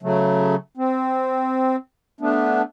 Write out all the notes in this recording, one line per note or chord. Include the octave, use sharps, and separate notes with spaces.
C#3 F#3 A3
C4
A3 B3 D4